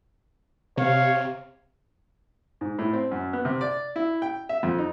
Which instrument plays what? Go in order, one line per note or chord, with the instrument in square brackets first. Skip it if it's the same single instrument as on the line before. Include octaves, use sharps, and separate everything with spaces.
[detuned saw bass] C3 [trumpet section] C#5 F5
[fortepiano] G#2
A2
C4
F#2
B3
C3
D5
E4
G5
E5
F2
D#4